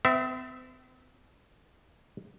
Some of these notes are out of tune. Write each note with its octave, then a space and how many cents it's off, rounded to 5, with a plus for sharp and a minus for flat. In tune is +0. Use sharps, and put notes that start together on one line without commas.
C4 -45 E5 +0